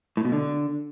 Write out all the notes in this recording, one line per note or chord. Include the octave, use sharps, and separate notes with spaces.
A2
B2
D3